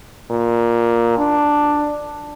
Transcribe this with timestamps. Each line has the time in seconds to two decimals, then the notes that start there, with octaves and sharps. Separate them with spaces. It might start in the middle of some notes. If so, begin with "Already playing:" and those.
0.30 A#2
1.18 D4